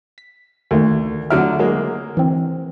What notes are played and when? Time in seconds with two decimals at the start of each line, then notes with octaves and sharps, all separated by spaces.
0.18 B6
0.71 D2 D#3 A3 A#3
1.30 D3 F#3 E5 F6 D7
1.59 F#3 G#3 A#3
2.17 E3 C4